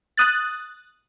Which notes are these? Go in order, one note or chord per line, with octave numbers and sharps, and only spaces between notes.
D#6 F#6 A6